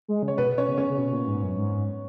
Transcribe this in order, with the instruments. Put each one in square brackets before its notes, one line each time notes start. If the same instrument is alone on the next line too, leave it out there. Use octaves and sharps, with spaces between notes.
[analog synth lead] G#3
C#3
[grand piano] C#5
[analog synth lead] B2 [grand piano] B3 B4
[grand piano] C#4 C#5
[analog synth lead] C#3
[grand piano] C#4 C#5
[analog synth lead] C#3
B2
A#2
G#2
F#2
G#2